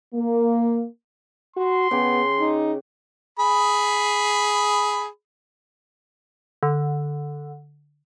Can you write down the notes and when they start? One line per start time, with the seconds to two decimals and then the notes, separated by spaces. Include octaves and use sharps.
0.15 A#3
1.56 F#4 C6
1.91 C#3 B3 G4
2.40 D#4
3.39 G#4 B5
6.63 D3